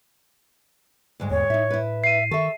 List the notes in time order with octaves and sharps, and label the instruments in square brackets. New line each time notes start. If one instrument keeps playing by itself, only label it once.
[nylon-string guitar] D2 G#2 G#3
[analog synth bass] E2 [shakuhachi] C#5
[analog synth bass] A2 [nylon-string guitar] D#4 E5
[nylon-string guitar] E4 B4
[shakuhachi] E5 [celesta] C7 D#7
[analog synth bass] D#3 [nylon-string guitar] A4 E5 [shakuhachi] C#6